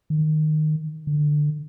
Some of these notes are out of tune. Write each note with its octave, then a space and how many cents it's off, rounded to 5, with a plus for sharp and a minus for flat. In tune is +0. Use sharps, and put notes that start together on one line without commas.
D#3 -15
D3 +15